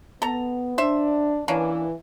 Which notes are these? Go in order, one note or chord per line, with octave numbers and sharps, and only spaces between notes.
B3 A4 A#5
D4 C5 E5
E3 A#3 C#4 D4